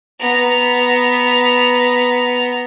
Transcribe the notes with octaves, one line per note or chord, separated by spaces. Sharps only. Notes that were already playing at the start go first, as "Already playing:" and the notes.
B3 A#5